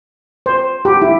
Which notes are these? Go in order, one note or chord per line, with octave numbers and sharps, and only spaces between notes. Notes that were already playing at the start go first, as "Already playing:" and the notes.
C5
G4
E4